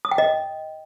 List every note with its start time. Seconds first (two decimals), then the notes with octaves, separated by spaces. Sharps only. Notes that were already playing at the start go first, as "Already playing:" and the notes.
0.05 D#6
0.11 G5
0.18 D#5